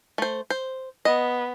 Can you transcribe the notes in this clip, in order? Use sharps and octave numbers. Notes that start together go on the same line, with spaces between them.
A3 C5
C5
B3 D#5